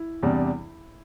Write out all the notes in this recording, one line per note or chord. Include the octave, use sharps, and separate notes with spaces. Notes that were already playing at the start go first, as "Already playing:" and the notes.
Already playing: E4
E2 C3 G3 D4